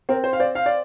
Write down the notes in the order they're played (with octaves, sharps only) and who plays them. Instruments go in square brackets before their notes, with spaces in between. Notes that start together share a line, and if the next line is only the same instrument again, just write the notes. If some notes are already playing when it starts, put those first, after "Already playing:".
[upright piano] C4 [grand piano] A#4
[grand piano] C5
F5
[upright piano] C5 [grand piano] D5
[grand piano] F5
D5